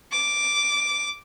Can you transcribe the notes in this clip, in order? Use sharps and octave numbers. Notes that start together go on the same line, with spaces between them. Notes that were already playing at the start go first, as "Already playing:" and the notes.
D6